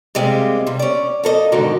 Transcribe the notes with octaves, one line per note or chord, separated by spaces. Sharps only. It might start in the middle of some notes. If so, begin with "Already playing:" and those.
C3 G3 G#3 A#3 C4
C3 G3
C#4 D5
A#3 A4 B4 D#5
G#2 B2 D3 D#3 D#4 F#4